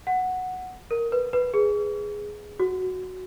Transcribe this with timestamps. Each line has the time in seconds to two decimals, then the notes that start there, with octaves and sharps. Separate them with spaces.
0.07 F#5
0.91 A#4
1.12 B4
1.33 B4
1.54 G#4
2.59 F#4